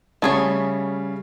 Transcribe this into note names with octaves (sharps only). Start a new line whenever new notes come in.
C#3 G3 A3 C#4 G#4 C#5